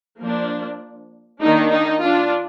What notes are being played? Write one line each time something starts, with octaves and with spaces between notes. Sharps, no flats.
F3 A#3 D4
D#3 A#3 D4 D#4
D#4
D4 F4